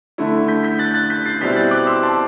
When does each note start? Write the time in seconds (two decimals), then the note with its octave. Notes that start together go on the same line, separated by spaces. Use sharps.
0.18 D3 A3 E4
0.48 G6 B6
0.64 G6 B6
0.79 F#6 A6
0.94 F#6 A6
1.10 G6 B6
1.26 A6 C7
1.41 B2 G3 C4 E4 G6 B6
1.56 F#6 A6
1.71 D6 F#6
1.87 C6 E6
2.03 A5 C6